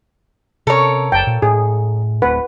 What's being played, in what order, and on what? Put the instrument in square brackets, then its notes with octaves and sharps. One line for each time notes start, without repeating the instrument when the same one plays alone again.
[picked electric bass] C3 C#4 [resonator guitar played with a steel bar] A4 A#4 C#5
[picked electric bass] F#1 [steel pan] G5 A5
[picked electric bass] A#2
[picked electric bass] A2 [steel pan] G#4
[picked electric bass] D1 A3 C4 [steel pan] B4 F#5